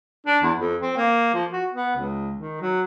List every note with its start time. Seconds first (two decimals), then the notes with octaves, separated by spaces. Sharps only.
0.27 D4
0.43 E2
0.57 F2
0.81 C4
0.97 A#3
1.34 F3
1.52 F#4
1.73 B3
1.96 C#2
2.37 D#3
2.61 F#3